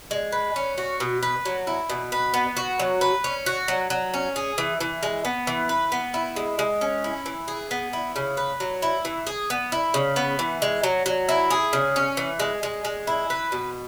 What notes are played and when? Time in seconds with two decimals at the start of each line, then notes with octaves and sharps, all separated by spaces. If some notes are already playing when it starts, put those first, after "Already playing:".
0.11 G#3
0.32 B4
0.56 C#4
0.78 F#4
1.00 B2
1.23 B4
1.45 F#3
1.67 E4
1.90 B2
2.12 B4
2.34 B3
2.57 F#4
2.80 F#3
3.01 B4
3.24 C#4
3.46 F#4
3.68 F#3
3.90 F#3
4.14 C#4
4.36 G#4
4.58 E3
4.80 E3
5.03 G#3
5.25 B3
5.47 E3
5.69 B4
5.92 B3
6.14 E4
6.36 G#3
6.59 G#3
6.81 C#4
7.04 E4
7.26 E3
7.48 G#4
7.71 B3
7.93 E4
8.16 C#3
8.37 B4
8.60 F#3
8.82 E4
9.05 E3
9.27 G#4
9.50 B3
9.72 E4
9.94 C#3
10.16 B3
10.39 E3
10.62 G#3
10.83 F#3
11.06 F#3
11.29 E4
11.51 G#4
11.73 C#3
11.96 C#4
12.17 E3
12.40 G#3
12.63 G#3
12.85 G#3
13.07 E4
13.30 B4
13.52 B2